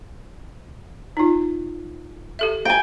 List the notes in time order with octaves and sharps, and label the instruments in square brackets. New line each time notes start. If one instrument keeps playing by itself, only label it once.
[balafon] D#4 F4
G4 A4 E5
[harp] G5 G#5